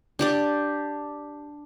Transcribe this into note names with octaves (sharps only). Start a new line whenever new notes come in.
D4 G4 D5